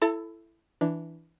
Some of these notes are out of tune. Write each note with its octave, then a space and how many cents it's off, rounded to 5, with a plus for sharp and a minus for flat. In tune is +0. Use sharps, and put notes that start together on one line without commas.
E4 +15 A4 +0 A5 +45
E3 +0 D4 +0